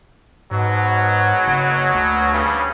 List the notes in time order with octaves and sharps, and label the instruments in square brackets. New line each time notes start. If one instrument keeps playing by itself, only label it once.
[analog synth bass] G#2 [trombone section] B2 F#3
[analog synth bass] F#1
D2
[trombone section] G2 C#3